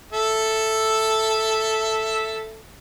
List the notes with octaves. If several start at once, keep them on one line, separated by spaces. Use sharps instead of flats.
A4 E5